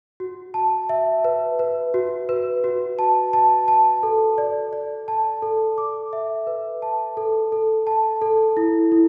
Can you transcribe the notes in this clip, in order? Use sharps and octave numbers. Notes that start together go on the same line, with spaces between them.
F#4
A5
E5
B4
B4
F#4
B4
F#4
A5
A5
A5
A4
D5
D5
A5
A4
D6
E5
B4
A5
A4
A4
A5
A4
E4
E4